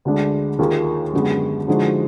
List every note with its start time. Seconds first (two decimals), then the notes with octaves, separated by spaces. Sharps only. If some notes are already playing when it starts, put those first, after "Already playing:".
0.05 D2 D3 G#3 D4
0.59 D#2 D#3 A#3 F4 G#4
1.13 F#2 D3 G#3 B3
1.68 D3 F3 G#3 D#4 F#4